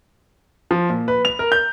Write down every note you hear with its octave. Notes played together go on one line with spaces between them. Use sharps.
F3
A#2
B4
F7
A#4
G6